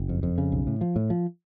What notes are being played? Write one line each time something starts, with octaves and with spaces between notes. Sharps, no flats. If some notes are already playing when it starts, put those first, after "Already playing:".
Already playing: F#1
F2
F2
C#3
B1
A2
F3
A2
F3